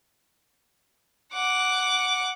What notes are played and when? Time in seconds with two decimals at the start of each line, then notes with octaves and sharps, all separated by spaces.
1.33 F#5 D6